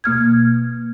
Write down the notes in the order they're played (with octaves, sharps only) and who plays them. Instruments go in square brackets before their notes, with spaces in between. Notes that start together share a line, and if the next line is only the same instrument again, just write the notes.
[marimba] B2 A#3 F6 G#6